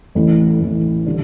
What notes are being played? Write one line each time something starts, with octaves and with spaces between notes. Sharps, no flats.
A1 A2 E3 A3 E4
A1 A2 E3 A3 E4
D3 G3